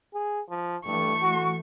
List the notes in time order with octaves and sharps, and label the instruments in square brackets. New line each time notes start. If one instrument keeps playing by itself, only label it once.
[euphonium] G#4
F3
[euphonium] G2 [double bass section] E3 A3 [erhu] C#6
[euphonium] F#4